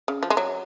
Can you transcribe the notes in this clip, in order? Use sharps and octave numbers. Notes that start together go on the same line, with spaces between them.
C#3
F3
G#3
F#3